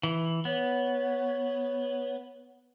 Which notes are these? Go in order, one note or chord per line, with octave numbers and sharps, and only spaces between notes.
E3
B3 C#5